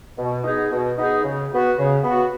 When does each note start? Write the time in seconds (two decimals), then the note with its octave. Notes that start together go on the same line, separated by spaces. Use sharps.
0.17 B2
0.44 B3 D#4 G#4
0.70 B2
0.97 B3 D#4 G#4
1.23 C#3
1.50 B3 F#4
1.77 C#3
2.03 B3 F#4